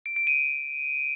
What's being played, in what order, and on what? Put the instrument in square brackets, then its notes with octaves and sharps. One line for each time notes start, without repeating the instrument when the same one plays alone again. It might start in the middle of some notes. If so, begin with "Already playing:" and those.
[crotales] D7
D7
D#7